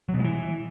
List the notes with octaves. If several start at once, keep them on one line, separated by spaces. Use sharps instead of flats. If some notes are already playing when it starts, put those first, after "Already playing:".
F#3
B2
G#3
E3